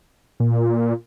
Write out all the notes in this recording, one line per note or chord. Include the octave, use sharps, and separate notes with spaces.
A#2